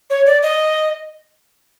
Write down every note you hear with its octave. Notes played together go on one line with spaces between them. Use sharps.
C#5
D5
D#5